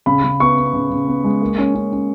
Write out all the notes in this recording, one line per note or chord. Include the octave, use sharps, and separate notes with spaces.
C#3 B5
C#3
B3 C#6
B3
C#3
C#3
B3
G#3
A#3
C#4
C#4
C#4